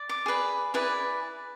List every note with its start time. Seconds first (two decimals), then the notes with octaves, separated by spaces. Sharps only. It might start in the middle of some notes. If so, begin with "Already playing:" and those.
Already playing: D5
0.09 D6
0.26 G#4 B4 D5
0.74 E4 G#4 B4 D5